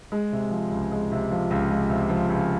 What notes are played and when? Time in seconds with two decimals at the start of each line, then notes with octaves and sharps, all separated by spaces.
0.12 G#3
0.32 C3
0.51 F3
0.71 C#2
0.92 G#3
1.12 C3
1.31 F3
1.50 C#2
1.70 G#3
1.90 C3
2.09 F3
2.29 C#2